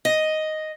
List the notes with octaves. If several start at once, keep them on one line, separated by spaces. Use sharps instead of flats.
D#5